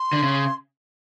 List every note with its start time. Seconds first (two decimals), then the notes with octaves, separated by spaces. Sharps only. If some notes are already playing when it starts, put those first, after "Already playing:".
Already playing: C6
0.13 D3
0.23 C#3